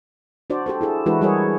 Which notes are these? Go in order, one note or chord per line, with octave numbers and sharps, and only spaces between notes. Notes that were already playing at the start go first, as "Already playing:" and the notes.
D4 F#4 C5 D5
G4 A4 C5
E4 G#4 A4
E3 G#3 D4 E4 F#4 B4
G3 F#4 G#4 A#4 C#5